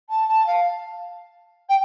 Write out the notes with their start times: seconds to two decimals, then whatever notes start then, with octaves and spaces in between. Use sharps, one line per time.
0.09 A5
0.28 A5
0.46 F5
1.69 G5